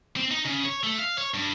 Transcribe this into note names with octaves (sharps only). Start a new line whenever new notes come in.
C4
D#4
C#3
C#5
A3
F5
C#5
G2